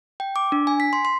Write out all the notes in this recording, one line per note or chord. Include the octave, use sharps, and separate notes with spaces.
G5
D6
D4
G#5
B6
C6
C6